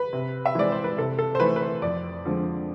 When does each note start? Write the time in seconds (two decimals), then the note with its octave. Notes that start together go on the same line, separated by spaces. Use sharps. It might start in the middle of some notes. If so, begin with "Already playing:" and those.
Already playing: B4
0.13 C3
0.46 E5
0.55 E3 G#3 C4 D5
0.72 C5
0.84 B4
0.98 C3 A4
1.18 A4
1.35 C5
1.40 E3 A3 B4
1.56 B4
1.62 C5
1.82 F2 D5
2.25 D3 F3 G#3 C4